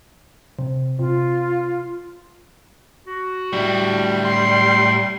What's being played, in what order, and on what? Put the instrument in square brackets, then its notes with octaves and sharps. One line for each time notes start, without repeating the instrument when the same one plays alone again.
[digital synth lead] C3
[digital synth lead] C3 [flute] F4
[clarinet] F#4
[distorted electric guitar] A2 D3 [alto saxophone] G3
[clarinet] C6